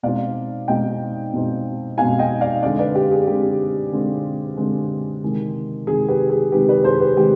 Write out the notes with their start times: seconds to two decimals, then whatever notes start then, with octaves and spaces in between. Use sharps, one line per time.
0.03 B2 G#3 C4 D#4 D5 F5
0.68 B2 G#3 C4 D#4 D#5 G5
1.33 B2 G#3 C4 D#4
1.98 B2 G#3 C4 D#4 F5 G#5
2.19 D#5 G5
2.41 D5 F5
2.63 D3 G#3 C4 D5 F5
2.79 B4 D5
2.95 G4
3.12 G#4
3.27 D3 G#3 C4 G4
3.92 D3 G#3 C4
4.57 D3 G#3 C4
5.22 C3 D#3 G#3
5.87 C3 D#3 G#3 G#4
6.08 G4 B4
6.30 G#4
6.51 C3 D#3 G#3 G4 B4
6.69 B4 D5
6.84 G#4 C5
7.00 G4 B4
7.17 C3 D#3 G#3 G4